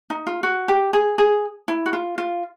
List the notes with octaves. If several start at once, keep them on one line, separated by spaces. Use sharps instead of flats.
D#4
F4
F#4
G4
G#4
G#4
E4
F#4
F4
F4